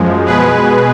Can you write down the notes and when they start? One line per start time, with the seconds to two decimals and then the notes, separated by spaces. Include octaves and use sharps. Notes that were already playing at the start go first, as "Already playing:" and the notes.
Already playing: F#2 F3 G#3
0.25 B2 G#3 G#4 B4